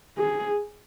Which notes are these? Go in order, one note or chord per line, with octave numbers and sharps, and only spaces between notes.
G#4